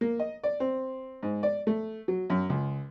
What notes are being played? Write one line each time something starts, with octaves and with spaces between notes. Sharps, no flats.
A#3
D#5
D5
C4
G#2
D5
A3
F#3
F#2
C#2